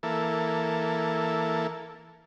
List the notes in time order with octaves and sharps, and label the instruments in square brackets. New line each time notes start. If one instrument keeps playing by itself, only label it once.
[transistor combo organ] E3 A#3 A4